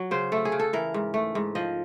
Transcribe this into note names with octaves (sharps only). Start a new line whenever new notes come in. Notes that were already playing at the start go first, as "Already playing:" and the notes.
Already playing: F#3
C#3 C5
A3 A4
G#4
C#3
A4
E3 A#4
G#2
A3
G#2
F3 D#5